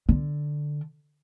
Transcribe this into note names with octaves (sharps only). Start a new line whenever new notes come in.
D3